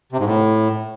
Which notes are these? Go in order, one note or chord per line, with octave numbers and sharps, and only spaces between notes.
C3
G#2
A2